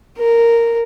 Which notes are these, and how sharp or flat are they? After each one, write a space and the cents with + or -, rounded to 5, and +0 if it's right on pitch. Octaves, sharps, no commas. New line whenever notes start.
A#4 -5